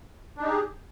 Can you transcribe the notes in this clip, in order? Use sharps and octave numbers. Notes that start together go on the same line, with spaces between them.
D4 D#4 G4 G#4